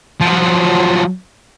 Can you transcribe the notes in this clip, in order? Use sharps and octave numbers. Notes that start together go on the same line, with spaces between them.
F3 F#3